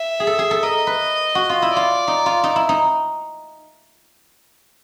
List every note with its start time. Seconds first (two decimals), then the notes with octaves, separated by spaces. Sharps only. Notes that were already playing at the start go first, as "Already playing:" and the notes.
Already playing: E5
0.20 G#4
0.27 A4
0.39 G#4
0.51 A4
0.63 A#4 D#5
0.87 B4
1.35 F#4
1.49 F4
1.62 E4
1.71 F4 D5
2.08 D#4
2.26 F4
2.44 D#4
2.56 E4
2.69 D#4